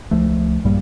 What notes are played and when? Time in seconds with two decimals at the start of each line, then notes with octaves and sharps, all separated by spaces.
0.11 C#2 F3 A3
0.64 A#1 G2 G3 A#3